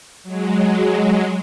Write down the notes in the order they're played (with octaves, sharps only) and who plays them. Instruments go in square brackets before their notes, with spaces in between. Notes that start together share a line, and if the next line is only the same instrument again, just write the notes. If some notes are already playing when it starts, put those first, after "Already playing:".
[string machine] F#3 G#3